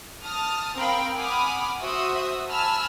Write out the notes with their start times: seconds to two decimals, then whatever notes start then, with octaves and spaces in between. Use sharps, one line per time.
0.23 A5 D#6 F6
0.76 C4 A#4 F5 G5 B5
1.17 F#5 G#5 B5 D6 D#6 F6
1.81 F#4 C5 E5 D#6
2.49 G#5 A5 B5 E6 F6